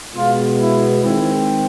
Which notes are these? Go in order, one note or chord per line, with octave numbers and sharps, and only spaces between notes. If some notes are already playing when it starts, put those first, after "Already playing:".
B2 G#3 B3 F4
E4
D#3 G#3 C4 E4